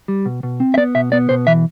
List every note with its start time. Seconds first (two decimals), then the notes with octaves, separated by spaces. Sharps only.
0.08 G3
0.26 B2
0.43 B2
0.60 C4
0.74 E5
0.77 B3 D5
0.95 B2 E5
1.12 B3 D5
1.29 B2 C5
1.47 E3 E5